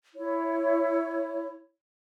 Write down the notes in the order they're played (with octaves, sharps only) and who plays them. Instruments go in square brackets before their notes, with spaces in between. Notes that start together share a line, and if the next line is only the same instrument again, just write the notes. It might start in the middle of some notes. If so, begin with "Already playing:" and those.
[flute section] E4 C#5